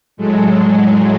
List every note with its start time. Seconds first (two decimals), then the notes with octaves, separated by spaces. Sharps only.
0.17 A2 F#3 G#3 A3